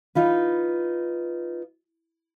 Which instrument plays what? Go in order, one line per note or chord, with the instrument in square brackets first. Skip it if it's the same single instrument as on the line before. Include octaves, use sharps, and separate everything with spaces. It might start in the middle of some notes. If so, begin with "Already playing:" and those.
[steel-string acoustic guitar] D#4 F4 B4